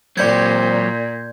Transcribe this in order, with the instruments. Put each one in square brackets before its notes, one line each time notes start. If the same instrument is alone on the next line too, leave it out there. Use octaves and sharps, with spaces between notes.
[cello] A#2 [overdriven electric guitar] F#3 G4 [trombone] C4 [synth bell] D5 G6 G#6